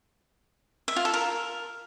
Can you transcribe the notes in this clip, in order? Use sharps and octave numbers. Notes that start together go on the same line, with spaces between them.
E5
F4
A4
A#4